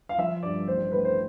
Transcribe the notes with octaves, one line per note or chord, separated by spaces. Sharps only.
F5
F3 E5
G2 D5
A1 C5
A2 B4
C5